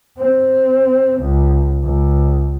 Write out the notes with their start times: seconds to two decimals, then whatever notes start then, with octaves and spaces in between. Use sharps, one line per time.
0.18 C4
1.20 C#2
1.83 C#2